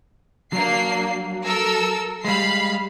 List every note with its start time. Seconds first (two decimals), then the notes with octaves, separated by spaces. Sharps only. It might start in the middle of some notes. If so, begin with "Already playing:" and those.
0.53 F#3 A#3 D4 C7
1.44 A4 A#4 E6
2.25 G3 G#3 F5 B5 C7